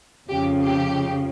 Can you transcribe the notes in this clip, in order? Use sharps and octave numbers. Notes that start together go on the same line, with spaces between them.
F2 C#3 F3 G4
G4